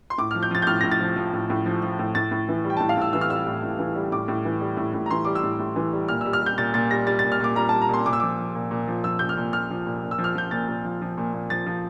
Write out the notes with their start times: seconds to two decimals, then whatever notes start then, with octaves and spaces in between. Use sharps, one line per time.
0.10 C6
0.18 A2 D6
0.31 F6
0.35 F3
0.43 G6
0.51 F3 A6
0.62 G6
0.67 A2 F6
0.81 A2 A#6
0.91 A6
1.01 F3
1.16 F3
1.33 A2
1.50 A2
1.66 F3
1.82 F3
1.99 A2
2.15 A2 A6
2.31 A2
2.49 E3
2.64 G3
2.70 G5
2.77 A5
2.80 A2
2.89 F5
2.97 A2 E6
3.13 E3 E6
3.21 F6
3.30 G3 E6
3.46 A2
3.63 A2
3.79 E3
3.95 G3
4.12 A2 D6
4.28 A2
4.45 E3
4.61 G3
4.77 A2
4.94 A2
5.06 A#5
5.11 E3 C6
5.25 G3 D6
5.35 E6
5.43 A2
5.59 A2
5.76 E3
5.93 G3
6.08 A#2 F6
6.21 E6
6.25 G3
6.33 F6
6.41 G3
6.46 G6
6.58 A#2 A6
6.74 A#2 A6
6.91 G3 A#6
7.07 G3 A6
7.19 A6
7.24 A#2
7.32 F6
7.40 A#2 D6
7.56 G3 A#5
7.69 A5
7.73 G3
7.82 A#5
7.89 A#2 C6
8.06 A#2 D6
8.13 E6
8.20 F3 D6
8.39 F3
8.55 A#2
8.71 A#2
8.88 F3
9.04 F3 E6
9.19 A#2 G6
9.29 F6
9.37 A#2
9.53 F3 F6
9.70 F3
9.86 A#2
10.02 A#2
10.11 E6
10.18 F3
10.24 F6
10.35 F3 G6
10.51 A#2 A6
10.68 A#2
10.84 F3
11.01 F3
11.18 A#2
11.34 A#2
11.50 F3 A6
11.66 F3